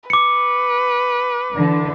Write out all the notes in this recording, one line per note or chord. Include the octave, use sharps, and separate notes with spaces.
B4 D6 C#7
D3 E3